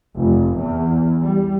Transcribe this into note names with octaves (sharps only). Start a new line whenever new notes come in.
F1
E2
G3